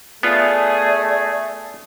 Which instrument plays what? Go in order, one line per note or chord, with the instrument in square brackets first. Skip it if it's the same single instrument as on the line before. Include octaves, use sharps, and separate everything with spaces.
[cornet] A3 [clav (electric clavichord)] B3 F4 [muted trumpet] G#4 [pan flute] D5